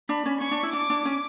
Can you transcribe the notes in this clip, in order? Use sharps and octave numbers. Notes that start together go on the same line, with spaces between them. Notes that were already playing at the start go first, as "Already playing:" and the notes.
D4 B5
C#4
C#4 C#6
D4
E4
D4 D6
D4
C#4